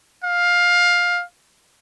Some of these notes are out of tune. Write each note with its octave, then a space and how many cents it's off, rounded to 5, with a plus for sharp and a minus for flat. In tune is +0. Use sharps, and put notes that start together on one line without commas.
F5 +15